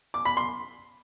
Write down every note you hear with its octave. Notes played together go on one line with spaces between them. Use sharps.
D6
B5
C6